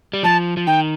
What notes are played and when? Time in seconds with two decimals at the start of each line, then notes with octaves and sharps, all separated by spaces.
0.13 G3
0.23 F3 A5
0.57 F3
0.67 D#3 G5